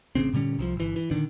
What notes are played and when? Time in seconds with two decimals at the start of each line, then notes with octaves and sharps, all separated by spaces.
0.15 A1 C#3 C4
0.33 A#2 D3 G3 C#4
0.59 C2 E3 F3
0.76 G1 E3
0.96 E3
1.11 A#2 D3 D#3 D4